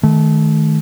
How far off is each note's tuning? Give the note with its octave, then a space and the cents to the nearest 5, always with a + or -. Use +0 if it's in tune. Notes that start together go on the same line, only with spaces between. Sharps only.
D#3 +0 A3 -25